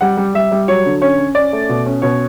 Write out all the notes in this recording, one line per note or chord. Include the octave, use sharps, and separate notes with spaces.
G3 F#5
G3
G3 E5
G3
F#3 C#5
D3
C#4 C#5
C#4
C#4 D5
A3
B2
C#4
B2 C#5